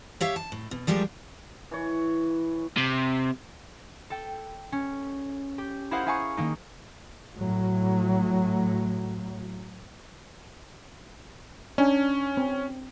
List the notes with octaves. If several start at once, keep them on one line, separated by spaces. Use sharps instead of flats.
G4 C#5 E5 F5
A5
A2
B2
F3 G3 G#3 G4 A#4
E3 C#5
C3
A4 G5
C#4
G4
E4 G#4 A#4 C5 F5 F#5
E4 G#4 F5 G#5 A#5 C#6
D#3 A#3 D#4
A2 F#3
C#4 D4 G#5
C4